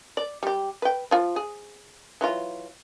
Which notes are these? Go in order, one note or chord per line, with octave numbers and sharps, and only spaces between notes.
D5
G3 G4
B4 G5
F3 F4
G#4
E3 F#3 F4